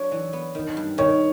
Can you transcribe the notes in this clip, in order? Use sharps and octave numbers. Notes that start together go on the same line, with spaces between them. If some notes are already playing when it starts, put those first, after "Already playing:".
Already playing: F#3 D4 C#5
E3
B3
D#3
G2
D#3 C#5